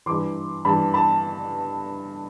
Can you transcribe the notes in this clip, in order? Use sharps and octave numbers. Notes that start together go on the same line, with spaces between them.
G2 E3 C6 D6
G2 E3 A5 B5
A5 B5